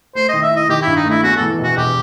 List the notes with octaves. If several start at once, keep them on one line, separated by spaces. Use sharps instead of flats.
A3 C5
D#5
D#3
E5
E4 D#5
D#3 G4
E4
G2
D#4
A3 E4
E2 F#4
E3 A4
E1 F#4
E1 G4